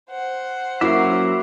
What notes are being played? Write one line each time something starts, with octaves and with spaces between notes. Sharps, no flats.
C5 F#5
F#3 A#3 C#4 E4 F#4 E5 D6 C7